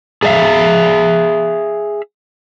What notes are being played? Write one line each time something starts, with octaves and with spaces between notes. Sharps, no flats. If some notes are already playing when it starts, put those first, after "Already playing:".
G#4 A4 D5 E5 F5